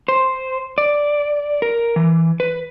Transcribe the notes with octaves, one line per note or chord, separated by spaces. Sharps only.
C5
D5
A#4
E3
B4